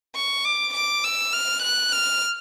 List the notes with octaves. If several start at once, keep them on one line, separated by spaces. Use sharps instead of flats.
C#6
D6
D6
E6
F6
F#6
F6